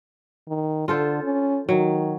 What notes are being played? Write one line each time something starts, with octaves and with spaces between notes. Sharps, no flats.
D#3
D3 F4 A4 C5
C#4
D#3 F#3